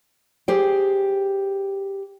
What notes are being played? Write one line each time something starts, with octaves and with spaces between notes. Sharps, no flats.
G4 G#4 C5 G5